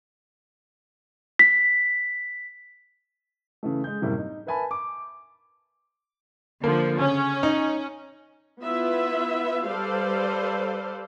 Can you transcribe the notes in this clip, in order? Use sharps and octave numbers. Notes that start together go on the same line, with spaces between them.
B6
C#3 E3 A3
G#3 G6
F#2 A2 C3 G3 A#3 E4
D#4
A#4 B4 E5 G#5 A5 B5
D6
D3 F3 A#3
C#3 C#4
D#4
B3 E4 F4 B4 E5
G3 A4 B4 C5 D5 F5